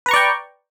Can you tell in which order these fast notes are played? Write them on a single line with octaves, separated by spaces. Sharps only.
B4 A#5 C#6 D5 G5